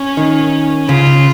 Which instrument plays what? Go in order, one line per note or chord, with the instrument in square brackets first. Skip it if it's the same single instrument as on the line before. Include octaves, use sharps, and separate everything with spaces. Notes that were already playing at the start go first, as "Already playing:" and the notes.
Already playing: [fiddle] C#4
[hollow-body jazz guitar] D#3
[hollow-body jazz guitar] C#3 [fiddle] F4